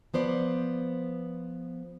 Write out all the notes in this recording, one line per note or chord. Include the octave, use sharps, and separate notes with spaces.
F3 B3 C5 D5